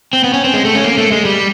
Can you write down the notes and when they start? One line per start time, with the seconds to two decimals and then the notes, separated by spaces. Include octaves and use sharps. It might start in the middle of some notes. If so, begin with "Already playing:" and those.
0.13 C4
0.24 B3
0.34 C#4
0.44 C4
0.54 G#3
0.65 A3
0.75 C#4
0.84 A#3
0.98 A3
1.11 G#3
1.25 G3